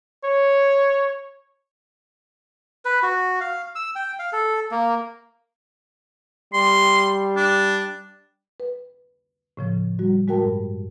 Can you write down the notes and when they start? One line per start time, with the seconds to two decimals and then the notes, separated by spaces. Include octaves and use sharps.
0.24 C#5
2.85 B4
3.03 F#4
3.41 F5
3.75 E6
3.96 G5
4.19 F5
4.33 A4
4.71 A#3
6.53 G3 C6
7.37 D4
8.60 B4
9.57 A2 C#3 F3
9.99 G3 F#4
10.27 A2 G#3 F#4 A#4 G5 A5
10.44 G2